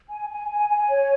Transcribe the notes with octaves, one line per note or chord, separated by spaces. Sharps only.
G#5
G#5
G#5
G#5
C#5